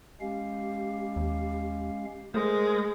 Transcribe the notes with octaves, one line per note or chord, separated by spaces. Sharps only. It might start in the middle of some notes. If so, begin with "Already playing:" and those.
G#3 C#4 G4 F5
D#2
G#3 A3 A#4 C5 D#6